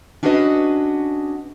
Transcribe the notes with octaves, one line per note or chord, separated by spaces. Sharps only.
C#4 D4 F#4 G#4 B4 D#5